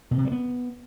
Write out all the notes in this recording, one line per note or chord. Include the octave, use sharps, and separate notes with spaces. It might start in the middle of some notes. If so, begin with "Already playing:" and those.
B2
C3
G3
B3